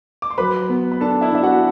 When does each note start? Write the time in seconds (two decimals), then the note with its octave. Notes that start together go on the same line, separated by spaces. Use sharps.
0.22 D6
0.30 C6
0.38 F#3 B4 B5
0.69 B3
0.91 B5
1.01 D4 A4 A5
1.21 E4 E5
1.32 D4 E5
1.43 F#4 F#5